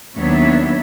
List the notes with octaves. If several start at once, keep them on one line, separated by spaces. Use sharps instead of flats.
D#2 F#3 B3 D4 C#5 E5